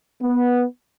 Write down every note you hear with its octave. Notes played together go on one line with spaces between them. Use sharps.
B3